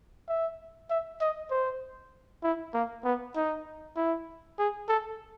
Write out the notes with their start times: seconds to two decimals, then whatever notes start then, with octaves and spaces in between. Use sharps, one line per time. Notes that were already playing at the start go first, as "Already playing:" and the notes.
0.28 E5
0.90 E5
1.21 D#5
1.51 C5
2.43 E4
2.74 A#3
3.04 B3
3.36 D#4
3.96 E4
4.59 G#4
4.89 A4